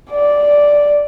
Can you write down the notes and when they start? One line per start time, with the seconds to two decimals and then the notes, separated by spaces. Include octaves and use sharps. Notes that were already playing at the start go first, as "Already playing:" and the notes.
0.11 D5